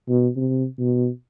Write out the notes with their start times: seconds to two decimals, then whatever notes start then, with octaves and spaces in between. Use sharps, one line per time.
0.08 B2
0.36 C3
0.79 B2